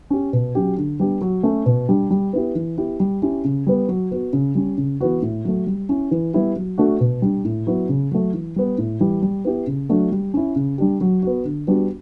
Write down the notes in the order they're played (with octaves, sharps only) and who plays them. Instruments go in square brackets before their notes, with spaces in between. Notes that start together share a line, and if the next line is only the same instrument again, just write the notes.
[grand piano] C#4 G4
B2
F#3 C#4 G4
D3
G3 B3 D4 G4
F#3
A3 C#4
B2
G3 D4 G4
G3
B3 E4 G4
E3
B3 E4 G4
G3
C#4 E4 G4
C#3
G3 B3
F#3
B3 F#4
C#3
G3 C#4
C#3
E3 B3 F#4
A2
F#3 A3
G3
C#4 E4
E3
G3 B3 E4 G4
F#3
A3 D4 F#4
B2
G3 D4
A2
F#3 B3 E4
C#3
F#3 A3
E3
G3 B3
A2
E3 G3
G3
B3 E4 G4
C#3
F#3 A3 D4
G3
C#4 E4
C#3
G3 D4 G4
F#3
B3 F#4
D3
G3 B3 D4 F#4